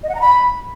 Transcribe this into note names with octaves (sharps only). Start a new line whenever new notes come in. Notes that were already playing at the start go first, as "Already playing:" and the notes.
D#5
F#5
A#5
B5